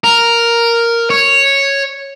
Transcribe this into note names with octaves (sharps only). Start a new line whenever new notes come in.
A#4
C#5